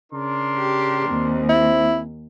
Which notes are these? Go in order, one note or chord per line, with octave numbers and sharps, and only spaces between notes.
C#3 D4 A#4 C6
G4
D#2 C4
E4